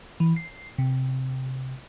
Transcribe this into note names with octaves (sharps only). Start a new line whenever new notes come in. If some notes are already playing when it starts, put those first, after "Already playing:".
E3
C7
C3